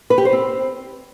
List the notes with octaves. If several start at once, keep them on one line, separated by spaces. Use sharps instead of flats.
B4
G4
C5
C4